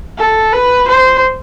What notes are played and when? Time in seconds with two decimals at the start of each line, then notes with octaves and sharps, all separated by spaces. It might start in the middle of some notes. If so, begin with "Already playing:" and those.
0.18 A4
0.53 B4
0.88 C5